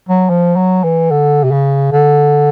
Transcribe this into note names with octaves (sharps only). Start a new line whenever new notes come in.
F#3
F3
F#3
E3
D3
C3
C#3
D3